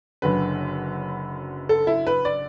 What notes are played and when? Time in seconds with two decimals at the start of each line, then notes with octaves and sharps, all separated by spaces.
0.22 F#1 F#2 D3 B4
1.69 A4
1.87 E4
2.07 B4
2.25 D5